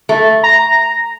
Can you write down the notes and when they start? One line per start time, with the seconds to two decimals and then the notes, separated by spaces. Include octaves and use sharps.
0.09 A3
0.44 A#5